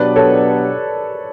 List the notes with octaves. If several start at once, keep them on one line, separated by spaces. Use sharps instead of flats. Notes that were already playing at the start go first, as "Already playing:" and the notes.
Already playing: B2 F#3 B3 D4 G4 B4 D5
A4 C#5